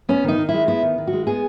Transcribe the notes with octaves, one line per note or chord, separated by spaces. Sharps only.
B3 C#4
D#3 D#4
D#3
E4
G#3
B3 E4
D#3
D#3
F#4
G#3
B3 G#4